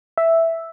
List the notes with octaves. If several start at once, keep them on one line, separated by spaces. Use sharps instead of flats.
E5